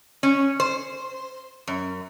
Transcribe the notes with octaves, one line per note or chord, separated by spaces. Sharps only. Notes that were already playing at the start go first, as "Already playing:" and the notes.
C#4
C5
F#2